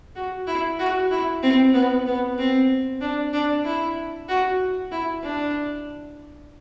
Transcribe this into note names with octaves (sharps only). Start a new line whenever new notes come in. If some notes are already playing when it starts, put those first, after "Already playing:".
F#4
E4
F#4
E4
C4
B3
B3
C4
D4
D4
E4
F#4
E4
D4